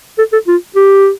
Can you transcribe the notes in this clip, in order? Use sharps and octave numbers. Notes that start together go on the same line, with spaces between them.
A4
A4
F4
G4